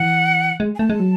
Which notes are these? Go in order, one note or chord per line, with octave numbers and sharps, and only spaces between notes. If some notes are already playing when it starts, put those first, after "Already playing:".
Already playing: E3 F#5
G#3
G#5
A3 A5
G#3
F#3